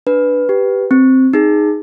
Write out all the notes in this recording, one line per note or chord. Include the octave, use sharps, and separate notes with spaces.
D4 B4
G4
C4
D#4 G#4